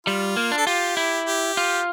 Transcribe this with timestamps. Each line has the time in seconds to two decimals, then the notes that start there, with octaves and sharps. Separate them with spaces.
0.07 G3 F4
0.37 A#3
0.51 D4
0.58 A4
0.67 F4 G4
0.97 E4
1.26 G4
1.57 F4